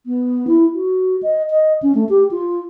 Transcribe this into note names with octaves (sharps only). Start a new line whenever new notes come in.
B3
E4
F#4
D#5
D#5
C#4
A3
G4
F4